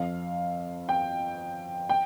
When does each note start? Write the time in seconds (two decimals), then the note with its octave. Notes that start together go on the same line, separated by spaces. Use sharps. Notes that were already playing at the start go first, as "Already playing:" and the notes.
Already playing: F2 F3 F5
0.89 G5
1.89 G5